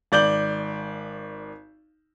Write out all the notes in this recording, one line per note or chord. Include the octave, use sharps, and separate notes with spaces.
G#1 D5 G6 F#7